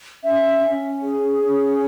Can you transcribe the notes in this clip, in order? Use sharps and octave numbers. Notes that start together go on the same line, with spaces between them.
C#4 E5
C#4
G#4
C#4